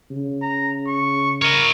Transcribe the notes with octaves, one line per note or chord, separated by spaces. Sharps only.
C#3
A#5
C#6
A#4 C#5 D#5